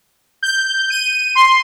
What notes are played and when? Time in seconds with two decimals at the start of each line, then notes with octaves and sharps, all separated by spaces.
0.43 G6
0.90 D#7
1.35 C6